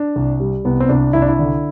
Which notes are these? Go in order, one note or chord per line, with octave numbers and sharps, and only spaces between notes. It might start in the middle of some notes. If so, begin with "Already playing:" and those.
Already playing: D4
C2
G3
C2 B3
C4
C2 D4
C2 E4
D4
E4
D3